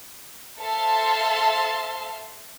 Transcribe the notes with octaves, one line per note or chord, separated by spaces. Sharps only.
A4 C5 E5 F5 A5 C6